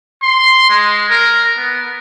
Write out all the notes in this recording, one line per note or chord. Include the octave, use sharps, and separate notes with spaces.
C6
G#3
A#4
B3